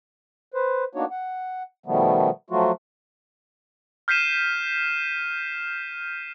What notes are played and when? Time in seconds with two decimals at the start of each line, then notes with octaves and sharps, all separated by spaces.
0.54 B4 C5
0.95 A#3 B3 D4 D#4 F#4 C#5
1.11 F#5
1.86 B2 D#3 F3 G3 A3 B3
2.50 F3 F#3 A3 F4 F#4
4.08 F6 G6 B6 C7 D#7 E7